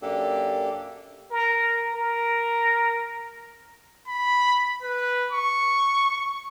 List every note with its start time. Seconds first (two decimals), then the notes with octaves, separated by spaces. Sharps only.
0.02 F#2 A#3 D4 G4 A4
1.31 A#4
1.94 A#4
4.08 B5
4.83 B4
5.32 C#6